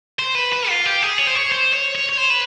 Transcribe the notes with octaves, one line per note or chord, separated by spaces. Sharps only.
C5
B4
B4
F4
G4
G#4
C#5
C5
C#5
C5
C#5
C#5
C#5
C5
B4